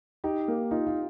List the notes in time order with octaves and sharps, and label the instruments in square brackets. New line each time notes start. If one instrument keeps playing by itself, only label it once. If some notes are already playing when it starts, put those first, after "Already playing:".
[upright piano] D#4 [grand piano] G4
[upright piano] A#3
[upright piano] D#4 [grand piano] F4
[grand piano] F4